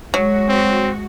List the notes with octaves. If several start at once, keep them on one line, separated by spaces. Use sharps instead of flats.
F#3 G#3 F#4
C4